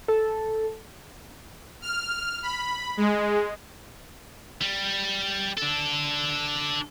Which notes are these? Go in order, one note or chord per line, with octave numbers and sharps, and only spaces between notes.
A4
F6
B5
G#3
G3
D4 A4